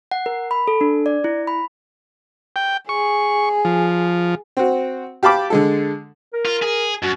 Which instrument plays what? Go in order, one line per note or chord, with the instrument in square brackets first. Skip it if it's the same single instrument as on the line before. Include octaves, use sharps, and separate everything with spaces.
[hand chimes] F#5
A#4
B5
A4
D4
D5
E4
B5
[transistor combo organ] G5
[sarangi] G#4 [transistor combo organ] C#6
[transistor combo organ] F3
[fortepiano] C4 F#4
G4 F5 A5 B5 D6
D3 G#3 A4
[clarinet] A#4
[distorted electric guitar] F4
G#4
[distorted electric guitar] F#2 [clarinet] F#4